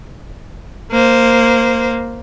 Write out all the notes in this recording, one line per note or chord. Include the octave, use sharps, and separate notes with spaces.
A#3 C5